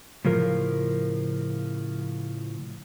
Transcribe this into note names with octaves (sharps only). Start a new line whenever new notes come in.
A2 C#3 F3 A#4